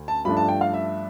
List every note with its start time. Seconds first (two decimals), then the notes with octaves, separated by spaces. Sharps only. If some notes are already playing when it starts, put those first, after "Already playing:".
Already playing: D2
0.08 A5
0.25 G2 F3 A3 D4 B5
0.37 A5
0.48 G5
0.61 F5
0.74 E5